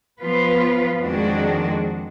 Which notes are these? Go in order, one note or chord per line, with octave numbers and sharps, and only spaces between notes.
F3 B3 F4 B4
F2 D#3 G#3 D4 F#4